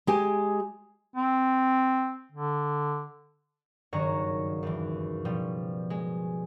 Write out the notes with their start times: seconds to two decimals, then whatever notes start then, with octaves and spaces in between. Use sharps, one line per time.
0.07 G#3 G4 G#5
1.16 C4
2.32 D3
3.93 F#1 G2 D#3 F#4 C#5 A#5
4.63 D#2 E3
5.25 B2 F3 G3
5.90 G#3